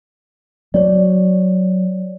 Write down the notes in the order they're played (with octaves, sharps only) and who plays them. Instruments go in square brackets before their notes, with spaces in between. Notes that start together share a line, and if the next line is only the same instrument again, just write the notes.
[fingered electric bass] F#3 [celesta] C#5 D5